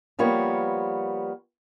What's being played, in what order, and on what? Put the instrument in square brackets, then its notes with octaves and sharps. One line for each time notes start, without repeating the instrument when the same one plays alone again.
[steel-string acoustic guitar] F3 G3 A#3 B3 C#5